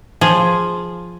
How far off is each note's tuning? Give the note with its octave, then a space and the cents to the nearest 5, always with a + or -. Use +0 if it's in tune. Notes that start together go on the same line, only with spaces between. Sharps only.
F3 +0 G#4 +0